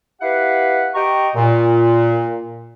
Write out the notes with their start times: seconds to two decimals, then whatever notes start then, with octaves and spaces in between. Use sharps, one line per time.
0.21 E4 G4 B4 F5 F#5
0.95 G4 D#5 G5 A#5 C#6
1.35 A#2